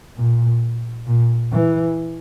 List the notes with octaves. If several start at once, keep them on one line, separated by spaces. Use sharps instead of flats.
A#2
A#2
E3